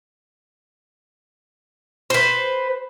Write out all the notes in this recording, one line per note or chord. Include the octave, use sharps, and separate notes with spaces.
B4 C5